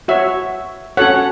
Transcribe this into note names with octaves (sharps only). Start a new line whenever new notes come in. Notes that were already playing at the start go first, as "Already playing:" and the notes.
F#4 C#5 E5
C#4 F#4 A4 C#5 F#5